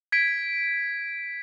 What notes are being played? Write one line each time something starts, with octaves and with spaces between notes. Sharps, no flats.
G#6 B6 D7